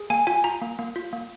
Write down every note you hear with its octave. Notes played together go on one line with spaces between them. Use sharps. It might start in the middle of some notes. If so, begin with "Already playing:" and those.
Already playing: G#4
A#3 G#5
F4 G#5
F4 A#5
A#3
A#3
F4
A#3